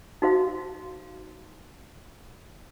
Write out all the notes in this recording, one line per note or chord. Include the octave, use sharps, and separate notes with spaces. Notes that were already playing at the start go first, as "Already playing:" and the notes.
D#4 F#4 C5 F5